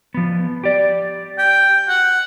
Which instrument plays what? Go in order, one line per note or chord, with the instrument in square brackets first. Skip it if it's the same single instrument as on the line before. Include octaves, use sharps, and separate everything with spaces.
[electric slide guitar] F3 B3
G4 D5
[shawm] G5
F#5